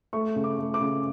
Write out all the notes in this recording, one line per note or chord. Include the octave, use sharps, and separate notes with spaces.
A3 C#6
C#3
D6
A3
D6
C#3